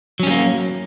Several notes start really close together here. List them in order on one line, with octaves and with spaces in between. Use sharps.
F#3 C#4 G3 A#3